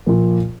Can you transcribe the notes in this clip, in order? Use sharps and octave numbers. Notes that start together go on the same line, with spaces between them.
A#2 F3 A#3 F4